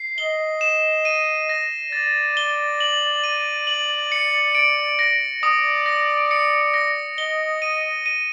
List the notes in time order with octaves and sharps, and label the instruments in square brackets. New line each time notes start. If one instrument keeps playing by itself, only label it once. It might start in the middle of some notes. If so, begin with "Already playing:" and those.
Already playing: [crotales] C7
[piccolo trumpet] D#5 [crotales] G7
[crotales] E7
D#7
A#6
[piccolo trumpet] D5 [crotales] A6
[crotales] G7
F#7
D#7
F#7
C#7
D7
A#6
[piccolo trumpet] D5 [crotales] D#6
[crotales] A#6
C#7
A#6
[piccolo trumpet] D#5 [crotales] G7
[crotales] D#7
D#7